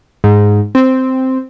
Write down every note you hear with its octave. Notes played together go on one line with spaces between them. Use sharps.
G#2
C4